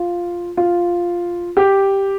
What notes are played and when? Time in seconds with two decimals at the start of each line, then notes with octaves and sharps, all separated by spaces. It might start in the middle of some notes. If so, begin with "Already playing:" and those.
Already playing: F4
0.57 F4
1.57 G4